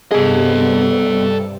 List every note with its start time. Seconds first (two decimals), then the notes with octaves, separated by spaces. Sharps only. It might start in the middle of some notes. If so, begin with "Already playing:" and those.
0.11 G2 C3 G3 B3 G#4 A4 D#5